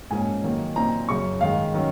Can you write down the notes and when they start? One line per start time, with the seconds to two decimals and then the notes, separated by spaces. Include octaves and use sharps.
0.11 G#2 F3 A#3 C#4 G#5
0.43 F2 D#3 F#3 A#3
0.76 A#2 F#3 C4 D#4 A#5
1.08 F#2 C#3 F#3 C#4 C#6
1.41 G#2 D#3 G#3 F5
1.74 D#3 F#3 C#4